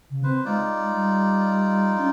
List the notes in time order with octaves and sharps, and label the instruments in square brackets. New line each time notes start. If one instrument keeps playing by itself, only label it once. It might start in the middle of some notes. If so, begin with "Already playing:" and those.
[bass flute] C#3
[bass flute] C4 [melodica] B4 C5
[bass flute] G#3 [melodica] D#4 F4 D5
[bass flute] G3
C#4